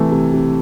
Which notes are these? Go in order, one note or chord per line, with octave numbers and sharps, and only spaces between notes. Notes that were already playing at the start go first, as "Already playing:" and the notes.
Already playing: C3 E3 A3
C3
C3